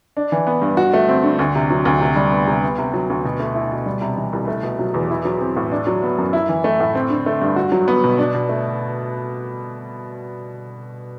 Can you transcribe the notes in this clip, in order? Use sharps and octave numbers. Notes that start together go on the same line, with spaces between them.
D4
E3
B3
G2
F#4
A3
C4
D3
D2
C3
F#3
D2
C3
G3
B3
C3
B3
C3
F#3
D2
B2
A3
E4
B2
G3
C3
E3
C2
A3
B2
F#3
E2
E4
F#3
C4
A2
D4
F#3
B3
F#2
E4
E3
A3
A2
C4
D3
A3
G2
F#4
F#3
B3
B2
D4
B2
A3